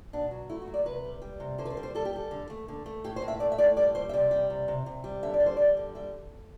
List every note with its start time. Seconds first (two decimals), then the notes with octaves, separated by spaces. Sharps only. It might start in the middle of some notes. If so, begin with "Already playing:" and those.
0.13 B2 D4
0.31 F#3
0.49 A3 E4
0.62 F#4
0.68 F#3
0.74 D5
0.85 C3 B4
1.04 G3
1.22 G3
1.40 C3
1.58 D3 C5
1.65 B4
1.70 C5
1.77 G3
1.83 C5
1.95 G3 A4
2.05 G4
2.13 G3 A4
2.31 D3
2.50 A3
2.68 D3
2.86 A3
3.04 A2 G4
3.16 C5
3.22 A2
3.28 E5
3.40 A3 D5
3.52 E5
3.58 A2 D5
3.76 G3 D5
3.95 G3 C5
4.09 E5
4.14 C3 D5
4.31 G3
4.50 C3
4.68 C3
4.86 C3
5.04 G3
5.23 D3 E5
5.34 D5
5.40 G3
5.46 C5
5.57 G3 D5
5.77 D3
5.95 G3 E5